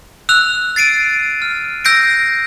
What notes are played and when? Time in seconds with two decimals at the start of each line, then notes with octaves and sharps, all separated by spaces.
0.29 E6 F#6 F7
0.76 A6 C7 D7 D#7
1.42 F6
1.85 E6 G6 A#6 C7 D7